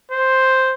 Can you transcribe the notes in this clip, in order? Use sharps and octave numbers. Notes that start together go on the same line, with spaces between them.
C5